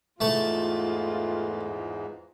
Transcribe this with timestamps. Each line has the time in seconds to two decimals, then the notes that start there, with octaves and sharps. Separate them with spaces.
0.21 E2 G#2 E3 A3 F4 A5 C#6